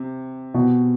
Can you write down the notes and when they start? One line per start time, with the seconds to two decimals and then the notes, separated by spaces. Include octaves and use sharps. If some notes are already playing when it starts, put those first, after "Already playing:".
Already playing: C3
0.54 B2